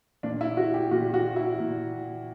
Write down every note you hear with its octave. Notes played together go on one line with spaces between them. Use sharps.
A#2 D4
E4
F#4
G4
A#2 F#4
F#4
E4
A#2